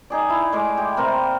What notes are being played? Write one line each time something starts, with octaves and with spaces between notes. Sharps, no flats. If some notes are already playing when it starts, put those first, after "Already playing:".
D#4 G#4 D5
E4
A2 G#3 D6
G4
C3 A#3 A#4 C5